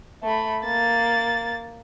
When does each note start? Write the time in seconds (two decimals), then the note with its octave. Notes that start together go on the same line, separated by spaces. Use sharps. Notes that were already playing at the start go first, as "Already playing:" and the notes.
0.23 A3 B5
0.64 A#3 A6